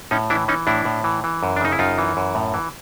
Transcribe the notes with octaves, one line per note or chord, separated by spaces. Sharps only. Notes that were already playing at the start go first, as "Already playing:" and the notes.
A2 C#4 D#4
E3 D4 E4
E3 C#4 D#4
A2 D4 E4
A2
E3
E3
F#2
D4
C#3 D#4
E4
F#2 D#4 F4
E3
F#2
A2
E3